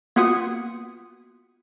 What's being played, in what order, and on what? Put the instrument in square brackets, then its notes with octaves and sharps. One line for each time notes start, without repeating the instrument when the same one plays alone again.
[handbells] A#3 B3 F4 F#4 F#5 D#6